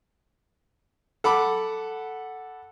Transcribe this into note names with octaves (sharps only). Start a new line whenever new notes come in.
A4 F#5 B5 D6